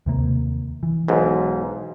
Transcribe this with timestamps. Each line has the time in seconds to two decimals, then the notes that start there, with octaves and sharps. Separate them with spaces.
0.06 D#2 C3 A#3
0.83 E3
1.08 B1 G#2